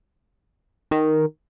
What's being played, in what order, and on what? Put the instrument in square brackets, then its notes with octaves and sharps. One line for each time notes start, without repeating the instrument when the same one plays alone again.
[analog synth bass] D#3